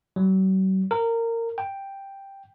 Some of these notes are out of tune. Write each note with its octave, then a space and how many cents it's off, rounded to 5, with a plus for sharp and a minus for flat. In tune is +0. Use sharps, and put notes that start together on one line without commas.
F#3 +45
A#4 -20
G5 +5